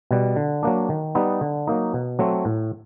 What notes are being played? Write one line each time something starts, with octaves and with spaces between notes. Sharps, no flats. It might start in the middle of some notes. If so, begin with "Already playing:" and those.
B2 G3
D3
F#3 A#3 D4
D#3
G3 B3 D#4
D3
F#3 A#3 D#4
B2
F#3 A3 C4
A2